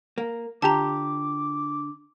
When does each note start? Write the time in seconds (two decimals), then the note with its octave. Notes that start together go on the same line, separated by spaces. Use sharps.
0.18 A#3
0.62 D3 F4 G4 A5 A#5 D6